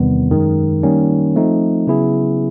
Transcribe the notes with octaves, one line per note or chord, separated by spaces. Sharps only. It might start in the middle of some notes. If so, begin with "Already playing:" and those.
Already playing: E2 C3 D#3 G3 B3
F#2 D#3 G#3
D#3 G3 A#3 C#4
F3 A3 C4 D#4
C#3 F#3 B3 E4 G#4